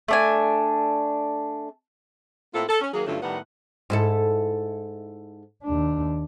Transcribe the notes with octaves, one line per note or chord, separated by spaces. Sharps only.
A3 D4 G#5
A2 A#3 C4 E4 F4 A4
A4
C#4
D#3 F#3 A#3 G#4
G2 D3 F#3 A3 C#4 F4
A2 D#3 G3 B3 F#5
G#2 E4 A4
D#2 D4